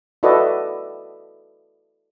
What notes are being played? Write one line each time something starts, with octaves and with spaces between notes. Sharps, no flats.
E4 F#4 A4 B4 D5 D#5